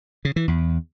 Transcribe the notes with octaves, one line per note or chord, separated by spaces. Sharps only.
C#3
E3
E2